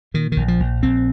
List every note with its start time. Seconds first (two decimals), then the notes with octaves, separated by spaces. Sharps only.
0.14 A#2 D#3
0.32 A#1 D#3
0.48 F3
0.59 A#1
0.83 A#1 C4